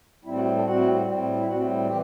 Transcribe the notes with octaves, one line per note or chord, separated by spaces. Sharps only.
A2 G3 C4 E4
F#4
G4
A4
A2 G3 C4 F#4
A2 G3 C4
E4
A2 G3 C4 F#4
E3 G4